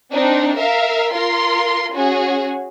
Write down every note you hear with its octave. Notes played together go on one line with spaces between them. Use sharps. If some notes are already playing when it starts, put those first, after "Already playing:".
C4 D4 D#4
A#4 E5 F5
F4 A#4 C6
C#4 F#4 G#4